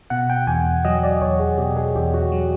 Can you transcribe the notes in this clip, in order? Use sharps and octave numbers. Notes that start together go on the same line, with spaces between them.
B2 F#5
G5
E2 G#5
F#3 D#5
D5
E2 C#5
G#4
B2 G4
G#4
E2 G4
F#4
F#3